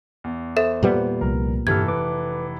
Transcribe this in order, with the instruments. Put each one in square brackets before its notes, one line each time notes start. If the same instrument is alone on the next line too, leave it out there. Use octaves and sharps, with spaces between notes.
[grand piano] E2
[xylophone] A4 E5 E7 [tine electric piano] C5
[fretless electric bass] A#2 G3 B3
[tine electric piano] C2 F3 [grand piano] A#4
[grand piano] F1 E3 A4 [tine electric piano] G2 G4 F6 [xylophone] G#6
[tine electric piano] B4 D6